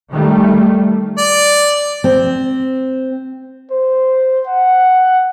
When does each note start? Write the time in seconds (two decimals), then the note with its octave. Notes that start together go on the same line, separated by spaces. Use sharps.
0.11 D#3 G3 A3
1.18 D5
2.04 C4
3.71 C5
4.47 F#5